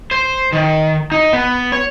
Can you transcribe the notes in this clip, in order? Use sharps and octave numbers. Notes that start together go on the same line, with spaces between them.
C5
D#3
D#4
B3
C#5